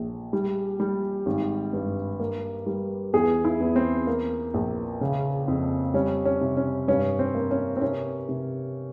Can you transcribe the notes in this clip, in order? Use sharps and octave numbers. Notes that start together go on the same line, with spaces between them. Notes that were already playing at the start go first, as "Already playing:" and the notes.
Already playing: A#1
G3
G3
G#1
G2
A#3
G3
E2 G#4
E4
E2
C4
A#3
A#1
C#3
F2
G3 C#4
C#4
C3
C#4
G2 C#4
C4
A#3
C#4
C4
C3 C#4
C3